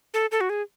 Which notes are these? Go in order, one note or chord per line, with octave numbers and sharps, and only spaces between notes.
A4
A4
F#4
G#4